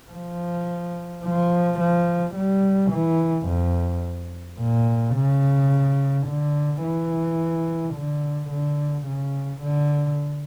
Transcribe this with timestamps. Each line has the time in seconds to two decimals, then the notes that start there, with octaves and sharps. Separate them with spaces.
0.11 F3
1.24 F3
1.80 F3
2.35 G3
2.92 E3
3.48 F2
4.59 A#2
5.16 C#3
6.27 D3
6.83 E3
7.95 D3
8.51 D3
9.07 C#3
9.62 D3